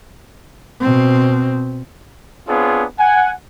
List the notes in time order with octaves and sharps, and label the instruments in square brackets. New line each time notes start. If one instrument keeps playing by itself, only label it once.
[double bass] B2 C4
[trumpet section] B3 C4 D4 F4 G#4 C#5
F#5 G#5